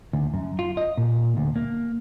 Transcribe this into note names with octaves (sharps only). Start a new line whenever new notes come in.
D2
F#2
F4
D#5
A#2
D2
A#3